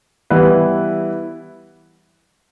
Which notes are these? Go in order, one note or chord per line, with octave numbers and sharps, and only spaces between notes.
E3 G3 B3 E4 B4